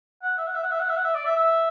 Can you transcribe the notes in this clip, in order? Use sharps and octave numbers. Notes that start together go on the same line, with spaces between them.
F#5
E5
F#5
E5
F#5
E5
F#5
E5
F#5
E5
D5
E5
E5